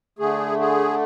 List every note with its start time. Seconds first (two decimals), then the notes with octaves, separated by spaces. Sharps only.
0.19 D3 A3 G#4
0.60 G#4